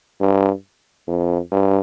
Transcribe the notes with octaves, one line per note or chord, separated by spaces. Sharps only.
G2
F2
G2